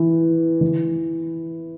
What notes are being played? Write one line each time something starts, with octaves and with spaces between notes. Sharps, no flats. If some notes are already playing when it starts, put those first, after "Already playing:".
Already playing: E3
E3